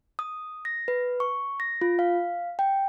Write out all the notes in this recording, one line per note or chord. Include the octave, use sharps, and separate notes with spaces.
D#6
A#6
B4
C#6
A#6
F4
F5
G5